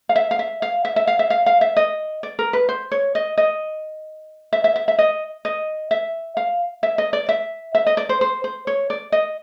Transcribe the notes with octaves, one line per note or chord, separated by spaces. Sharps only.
F5
E5
F5
E5
F5
E5
E5
F5
E5
F5
F5
E5
D#5
D5
A#4
B4
C5
C#5
D#5
D#5
E5
E5
E5
E5
D#5
D#5
E5
F5
E5
D#5
D5
E5
E5
D#5
D5
C5
C5
C5
C#5
D5
D#5